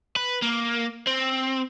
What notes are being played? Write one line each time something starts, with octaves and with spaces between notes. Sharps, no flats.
B4
A#3
C4